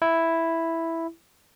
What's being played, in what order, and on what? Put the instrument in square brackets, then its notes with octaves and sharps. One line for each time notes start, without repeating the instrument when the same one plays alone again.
[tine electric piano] E4